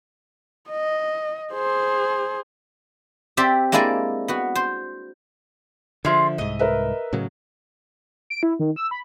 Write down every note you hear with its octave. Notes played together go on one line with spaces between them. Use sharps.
D#5
G#4 C5
C4 G4 C5 D5 E5
G#3 A#3 D4 E4 D5 G#5
B3 F#4
C5
D3 F3 F4 G#4 E5
C2 G#2 D#5
A#4 B4 E5
A2 C#3 F#3
D7
E4
D#3
E6
B5